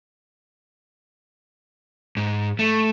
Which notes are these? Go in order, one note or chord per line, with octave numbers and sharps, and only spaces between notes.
G#2
A3